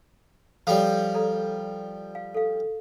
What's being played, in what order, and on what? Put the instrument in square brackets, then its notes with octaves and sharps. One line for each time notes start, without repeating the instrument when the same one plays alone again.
[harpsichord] F3 G3 [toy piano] A4 C#5
[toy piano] A4 D5 A#5
F5
A4 F5